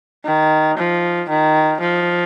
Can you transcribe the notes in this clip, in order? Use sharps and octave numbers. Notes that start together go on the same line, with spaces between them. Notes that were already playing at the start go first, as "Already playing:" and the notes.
D#3
F3
D#3
F3